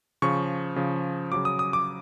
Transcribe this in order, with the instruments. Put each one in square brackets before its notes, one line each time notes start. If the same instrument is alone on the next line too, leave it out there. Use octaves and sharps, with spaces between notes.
[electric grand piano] C#3 F3 C#6
C#3 F3
C#3 F#3 D6
D#6
D#6
D6